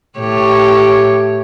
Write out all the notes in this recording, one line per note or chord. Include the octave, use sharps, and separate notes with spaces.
A2 G4 C#5